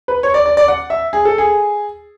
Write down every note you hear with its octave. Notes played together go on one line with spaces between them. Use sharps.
B4
C#5
D5
D5
D5
F#5
E5
G#4
A4
G#4